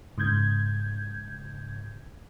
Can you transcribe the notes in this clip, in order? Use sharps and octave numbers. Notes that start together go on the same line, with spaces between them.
G#2 C#3 G6 G#6